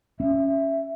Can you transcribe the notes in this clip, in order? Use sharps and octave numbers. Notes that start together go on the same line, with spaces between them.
C#4 E5